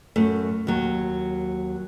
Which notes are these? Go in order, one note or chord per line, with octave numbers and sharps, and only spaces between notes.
F#2 A3
D#2 F#3